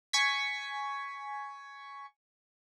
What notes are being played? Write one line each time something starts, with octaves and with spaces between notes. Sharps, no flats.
G#5 C#6 G#6 B6